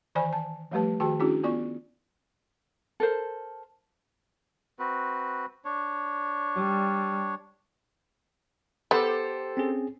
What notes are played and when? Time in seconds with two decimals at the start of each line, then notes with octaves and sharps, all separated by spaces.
0.15 D#3 E3 C5 D5 G#5 B5
0.33 A5
0.71 F3 G3 A3 G4 B4 A5
1.00 D#3 F#4 G#4 G5 A5
1.20 C#4 D4 E4 F#4 G#4
1.43 B3 F4 D5 C#6
3.00 A4 A#4 C5
4.79 C4 F#4 B4
5.65 D4 C#5
6.55 G3
8.91 B3 G4 A4 C5
9.57 C4 C#4 G#4